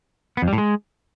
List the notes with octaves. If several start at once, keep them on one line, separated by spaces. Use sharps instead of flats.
B3
F2
G3
A2
G#3